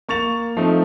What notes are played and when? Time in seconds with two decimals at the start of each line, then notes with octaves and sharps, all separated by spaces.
0.08 A#3 C#6 A6 F7
0.57 F3 A3 C4 D#4